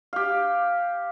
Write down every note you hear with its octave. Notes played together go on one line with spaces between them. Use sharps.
G4 F5